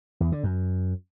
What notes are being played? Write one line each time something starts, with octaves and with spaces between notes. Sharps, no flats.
E2
D3
F#2